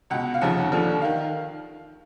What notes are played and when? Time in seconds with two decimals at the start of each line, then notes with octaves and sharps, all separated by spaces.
0.10 C#2 B2 F#5
0.34 F5
0.41 F1 D#2 C#3 F3 F#5
0.72 D#2 D3 F3
1.01 D#3 F5